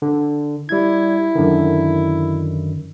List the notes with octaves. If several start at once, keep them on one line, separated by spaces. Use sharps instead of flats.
D3
G3 E4 G#6
F#2 D3 D#3